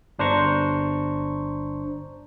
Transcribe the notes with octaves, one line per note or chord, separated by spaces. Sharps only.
G1 D4 C5 A#5 C#6